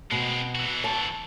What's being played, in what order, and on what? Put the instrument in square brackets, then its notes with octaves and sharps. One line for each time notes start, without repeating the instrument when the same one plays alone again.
[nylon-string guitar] B2 [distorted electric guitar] G#3 C4
[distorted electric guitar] E3 F#4
[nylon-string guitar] A5